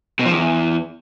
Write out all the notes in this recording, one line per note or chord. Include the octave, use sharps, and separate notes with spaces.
B2
F3
E2